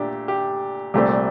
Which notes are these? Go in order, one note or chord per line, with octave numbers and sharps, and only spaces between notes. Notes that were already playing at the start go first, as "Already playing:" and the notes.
Already playing: A#2 A3 D4 G4
G4
C2 A#2 A3 C4 G4